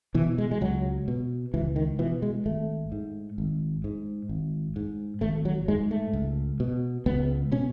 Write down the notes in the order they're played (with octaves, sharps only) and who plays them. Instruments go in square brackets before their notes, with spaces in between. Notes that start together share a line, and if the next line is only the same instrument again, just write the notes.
[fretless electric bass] B2 E3
G#3
G#3
C#2 F#3
B2
C#2 E3
D#3
B2 E3
G#3
G#1 A3
G#2
G#1
G#2
G#1
G#2
G#1 A3
F#3
G#2 G#3
A3
C#2
B2
C#2 B3
B2 C#4